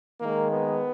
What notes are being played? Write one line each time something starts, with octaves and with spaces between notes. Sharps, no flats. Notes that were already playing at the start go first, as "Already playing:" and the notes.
D#3 G#3 A#3
B3